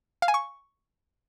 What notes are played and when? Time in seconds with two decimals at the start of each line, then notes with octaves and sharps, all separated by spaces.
0.22 F5
0.28 G#5
0.34 C#6